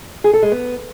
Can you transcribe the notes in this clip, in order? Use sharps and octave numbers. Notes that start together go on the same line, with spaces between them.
G#4
A4
G#3
B3